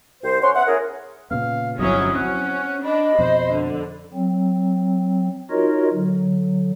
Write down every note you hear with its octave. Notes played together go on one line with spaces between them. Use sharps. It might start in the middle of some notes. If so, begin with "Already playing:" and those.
C2 C5
C#4 C#5 F#5 C6
B3 E5 F#5
C#4 E4 G#4 A#4
A#2 C#3 B3 F5
G1 C2 F2 F#3 C#4 E4 D#5
C4 C#4 F#5
D4 D#5 B5
F2 B2 C5
D3
F#3 C4
D#4 F4 F#4 A#4 C#5 D#5
D3 F#3